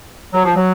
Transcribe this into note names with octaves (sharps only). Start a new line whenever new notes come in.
F#3
F3
F#3